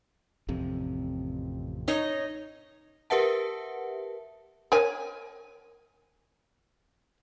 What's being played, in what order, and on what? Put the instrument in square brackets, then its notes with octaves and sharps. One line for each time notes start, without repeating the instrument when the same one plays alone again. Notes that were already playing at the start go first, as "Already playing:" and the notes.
[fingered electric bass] A1 F2 C3
[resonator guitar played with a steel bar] D#4 C#5 D#5
[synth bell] G4 A#4 B4 E5 F#5 A5
[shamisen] A#4 C#5 G#5